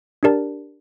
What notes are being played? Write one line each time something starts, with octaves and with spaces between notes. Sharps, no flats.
D4 G4 A#4 D5 A5